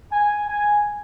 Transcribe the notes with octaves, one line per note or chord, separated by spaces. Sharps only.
G#5
G#5